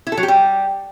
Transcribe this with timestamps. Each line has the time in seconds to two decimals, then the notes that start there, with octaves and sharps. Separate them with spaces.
0.07 E4
0.12 A4
0.17 F#3
0.23 G4
0.28 G3